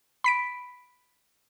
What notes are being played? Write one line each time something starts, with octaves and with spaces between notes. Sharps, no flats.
B5 B6 D7